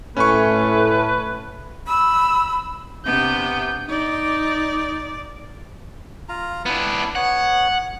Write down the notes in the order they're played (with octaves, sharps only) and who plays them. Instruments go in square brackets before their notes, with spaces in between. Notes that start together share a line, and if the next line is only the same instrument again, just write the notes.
[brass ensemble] A2 [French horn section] A3 [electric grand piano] C#4 G#5 C#6 [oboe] B4
[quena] B5 [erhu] E6
[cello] C3 B3 [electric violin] D4 G6
[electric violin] D#4 [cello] D5
[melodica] F4 A#5
[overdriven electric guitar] B3 D4 [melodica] E4
[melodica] B3 C#5 [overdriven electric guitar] F#5